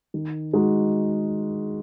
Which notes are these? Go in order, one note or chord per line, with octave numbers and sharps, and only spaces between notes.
D#3
G#3 D#4 F#4